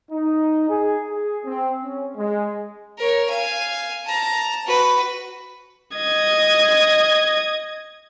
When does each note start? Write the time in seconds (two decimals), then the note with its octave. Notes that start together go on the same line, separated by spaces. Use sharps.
0.11 D#4
0.69 G#4
1.08 G#4
1.45 C4
1.83 C#4
2.16 G#3
2.99 A#4 C#5
3.29 F5 G#5
4.05 A5 A#5
4.66 F#4 B4
5.97 D#5 G#6